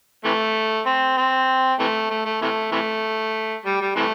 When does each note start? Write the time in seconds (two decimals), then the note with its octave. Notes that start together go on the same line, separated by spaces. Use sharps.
0.25 C3 E3 A3
0.86 C4
1.17 C4
1.79 C3 E3 A3
2.10 A3
2.25 A3
2.42 C3 E3 A3
2.72 C3 E3 A3
3.66 G3
3.81 G3
3.96 C3 E3 A3